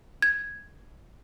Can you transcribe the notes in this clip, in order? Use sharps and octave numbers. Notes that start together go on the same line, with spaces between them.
G#6